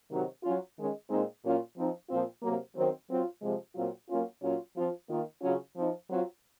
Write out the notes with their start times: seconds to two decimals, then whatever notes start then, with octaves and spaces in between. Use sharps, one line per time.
0.10 C3 D#3 F#3
0.43 F#3 C#4 F4
0.76 D#3 G#3 C#4
1.09 A#2 G#3 C4 D#4
1.43 A#2 F#3 C#4 F4
1.76 F3 C4 D#4
2.09 A#2 F3 C4 F4
2.42 C3 F#3 A#3
2.76 D#3 F#3 C4
3.09 F#3 C4 F4
3.41 C3 F3 G#3
3.75 A#2 F#3 C4 F4
4.09 F#3 A#3 C#4 F4
4.42 A#2 F#3 C#4 F4
4.75 F3 C4 F4
5.08 D#3 A#3 F4
5.41 C#3 F#3 C#4 F4
5.75 F3 C4 D#4
6.07 F#3 C4 F4